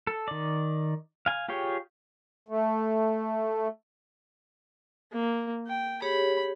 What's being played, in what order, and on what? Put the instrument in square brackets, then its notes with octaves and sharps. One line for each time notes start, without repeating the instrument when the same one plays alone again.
[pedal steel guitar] A4
D#3 D5
F5 G#5
F4 G4 G#4 C#5 G5
[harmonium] A3
[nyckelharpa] A#3
G5
[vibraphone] G4 G#4 C#5 [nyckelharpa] B5